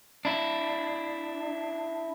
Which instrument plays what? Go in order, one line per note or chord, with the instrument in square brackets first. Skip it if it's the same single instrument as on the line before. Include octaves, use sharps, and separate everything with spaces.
[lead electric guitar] D4 E4